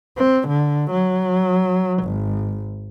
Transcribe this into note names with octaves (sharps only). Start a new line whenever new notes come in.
C4
D3
F#3
G#1